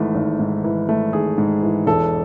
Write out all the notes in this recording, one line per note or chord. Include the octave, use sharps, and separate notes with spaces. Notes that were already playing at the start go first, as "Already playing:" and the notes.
Already playing: G#1 G#2 E3 A3
G#1
G#2
E3
A3
G#1 G#4
G#2
E3
E1 A4